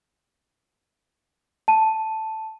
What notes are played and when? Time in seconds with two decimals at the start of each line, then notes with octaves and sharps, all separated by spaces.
1.68 A5 D#7